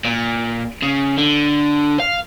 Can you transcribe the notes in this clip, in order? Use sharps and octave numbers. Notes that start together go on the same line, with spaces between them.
A#2
C#3
D3
F5